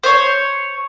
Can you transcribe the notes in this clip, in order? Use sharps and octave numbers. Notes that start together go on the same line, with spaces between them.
C5 C#5